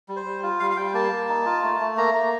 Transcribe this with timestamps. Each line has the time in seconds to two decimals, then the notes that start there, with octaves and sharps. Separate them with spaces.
0.09 G3
0.16 C5
0.26 G3
0.43 F4
0.60 G3 F5
0.71 F5
0.77 G3 G5
0.94 A#3 A5
1.12 A#3
1.29 D#4
1.46 F4
1.63 A3
1.80 A3
1.97 A#3 A#5
2.14 A#3 A#5